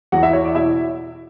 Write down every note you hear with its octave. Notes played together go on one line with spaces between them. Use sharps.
E2 F#4 F#5
E4 E5
E4 C#5
D5
B2 E4 E5